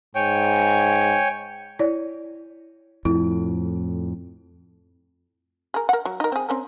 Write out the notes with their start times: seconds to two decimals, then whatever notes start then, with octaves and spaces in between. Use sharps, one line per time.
0.15 G#2 C#5 G5 G#5
1.79 E4 C#5 D5
3.05 F2 A2 E4
5.74 G#4 A#4
5.89 A#4 F#5
6.05 F#3
6.20 D#4 A#4
6.32 C4 G#4
6.49 C4 C#4 A#4